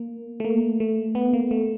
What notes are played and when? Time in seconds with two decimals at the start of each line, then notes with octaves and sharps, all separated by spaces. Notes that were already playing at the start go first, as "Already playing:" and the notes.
Already playing: A#3
0.40 A3
0.45 A#3
0.80 A3
1.15 B3
1.33 A#3
1.51 A3